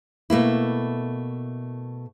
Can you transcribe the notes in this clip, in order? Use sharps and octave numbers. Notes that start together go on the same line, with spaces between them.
B2 A3 A#3 E4